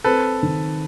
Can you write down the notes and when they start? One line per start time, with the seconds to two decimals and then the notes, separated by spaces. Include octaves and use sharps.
0.04 C4 A4 B4
0.43 D#3